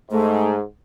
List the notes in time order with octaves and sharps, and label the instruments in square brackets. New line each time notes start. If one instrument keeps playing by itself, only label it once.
[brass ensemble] G#2 [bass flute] A3